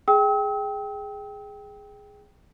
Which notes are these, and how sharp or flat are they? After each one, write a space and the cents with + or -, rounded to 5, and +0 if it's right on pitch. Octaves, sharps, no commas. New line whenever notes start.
G#4 +0 G5 +0 E6 -45